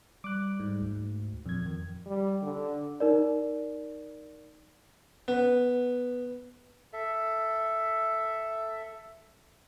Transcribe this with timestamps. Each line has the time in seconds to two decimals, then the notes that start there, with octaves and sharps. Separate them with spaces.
0.24 G3 D6 F#6
0.60 G#2
0.82 D2
1.46 F2 A#2 G#6
1.66 D#3
2.07 G3
2.43 D3
3.00 D#4 A#4 D5
5.28 B3
6.93 A4 E5